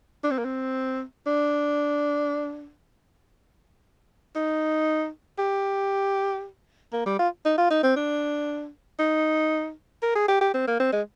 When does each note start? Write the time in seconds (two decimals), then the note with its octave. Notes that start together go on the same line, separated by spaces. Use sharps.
0.23 D4
0.31 C4
0.38 A#3
0.45 C4
1.27 D4
4.36 D#4
5.39 G4
6.93 A#3
7.06 G3
7.19 F4
7.45 D#4
7.58 F4
7.70 D#4
7.83 C4
7.96 D4
8.99 D#4
10.02 A#4
10.15 G#4
10.28 G4
10.41 G4
10.54 C4
10.67 A#3
10.80 C4
10.93 G#3